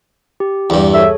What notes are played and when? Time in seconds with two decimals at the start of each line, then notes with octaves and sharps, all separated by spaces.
0.40 G4
0.70 E2 G2
0.94 G#4 A4 C#5 E5